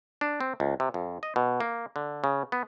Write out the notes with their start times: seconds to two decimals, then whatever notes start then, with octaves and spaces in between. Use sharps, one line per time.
0.21 D4
0.41 C4
0.60 C#2
0.80 C3
0.94 F2
1.23 D#5
1.36 B2
1.61 A#3
1.96 D3
2.24 C#3
2.52 B3